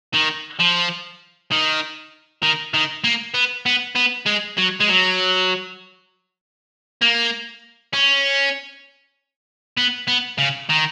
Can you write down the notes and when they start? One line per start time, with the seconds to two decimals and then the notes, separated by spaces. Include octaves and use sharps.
0.13 D#3
0.60 F3
1.52 D#3
2.43 D#3
2.74 D#3
3.04 A#3
3.34 B3
3.66 B3
3.95 B3
4.26 G#3
4.58 F#3
4.80 G#3
4.88 F#3
7.02 A#3
7.93 C#4
9.77 B3
10.08 B3
10.38 C#3
10.69 D#3